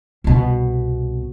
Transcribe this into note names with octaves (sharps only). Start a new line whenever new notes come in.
C2 B2